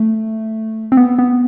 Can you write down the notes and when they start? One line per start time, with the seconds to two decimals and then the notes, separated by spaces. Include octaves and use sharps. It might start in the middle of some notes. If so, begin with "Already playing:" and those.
Already playing: A3
0.92 C4
0.97 B3
1.19 B3